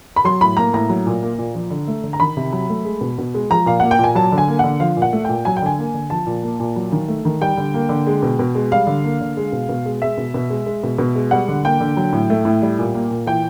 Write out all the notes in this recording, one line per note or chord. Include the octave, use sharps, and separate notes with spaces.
B5
F#3 C6
A2 B5
A#3 A#5
A2 A#5
F#3
A#2
A#3
A#2
F3
D3
A3
D3
A#5
D#3 B5
C3
F#3
A3
G#3
B2
B2
G#3
F3 A#5
A#2 F5
A#3 F#5
G5
A#2 G#5
F#3 A5
D3
G#5
A#3
D3 F#5
F3 F5
A#2
F#5
A3
A#2 G5
F#3 G#5
G5
D3 G#5
A#3
D3
F3 A5
A#2
A#3
A#2
F#3
D#3
A3
D#3
G3 G5
D3
A#3
D3
G#3
B2
B2
G#3
G3 F5
D3
A#3
D3
G#3
B2
B2
G#3
G#3 E5
B2
B2
G#3
G#3
B2
B2
G#3
G3 F#5
D3
A#3 G5
D3
F#3
A2
A3
A2
G3
A#2
A#3
A#2
E3 G5